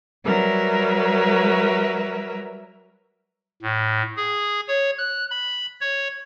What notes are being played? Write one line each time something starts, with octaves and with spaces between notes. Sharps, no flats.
F#3 G3 A#4 B4 E5
A2
G#4
C#5
F#6
B5
C#5